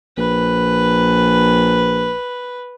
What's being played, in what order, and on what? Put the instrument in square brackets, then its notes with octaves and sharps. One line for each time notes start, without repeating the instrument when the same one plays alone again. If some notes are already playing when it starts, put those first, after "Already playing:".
[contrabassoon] A#1 [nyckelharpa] B4